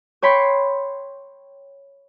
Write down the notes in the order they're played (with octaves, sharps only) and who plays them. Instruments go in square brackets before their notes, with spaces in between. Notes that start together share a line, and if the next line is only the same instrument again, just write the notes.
[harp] C#5 G5 B5 C6